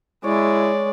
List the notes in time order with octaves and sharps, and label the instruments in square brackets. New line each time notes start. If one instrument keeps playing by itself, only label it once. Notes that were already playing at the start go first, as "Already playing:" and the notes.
[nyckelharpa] G#3 D5 [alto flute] E4 [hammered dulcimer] C#5